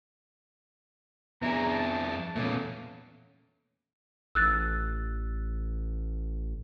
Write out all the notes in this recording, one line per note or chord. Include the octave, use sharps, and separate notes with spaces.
F2 B3 D4 E4 G#4 A#5
A5
E2 A#2 A3 B3 C#4
A1 E6 F#6 A6